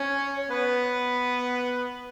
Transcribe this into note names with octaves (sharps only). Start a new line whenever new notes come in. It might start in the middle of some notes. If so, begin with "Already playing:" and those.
Already playing: C#4 C#5
C#5
B3 B4